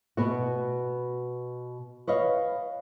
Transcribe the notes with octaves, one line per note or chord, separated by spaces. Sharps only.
B2 B3 F#4
B4 C#5 D#5 F5